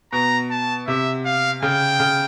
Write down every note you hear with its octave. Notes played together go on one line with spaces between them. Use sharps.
B2 A#5
A5
C3 E5
F5
C#3 G5
C#3